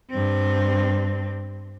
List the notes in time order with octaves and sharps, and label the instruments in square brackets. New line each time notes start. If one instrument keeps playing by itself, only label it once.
[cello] G2 C4